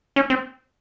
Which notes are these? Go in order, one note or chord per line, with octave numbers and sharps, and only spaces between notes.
C#4
C4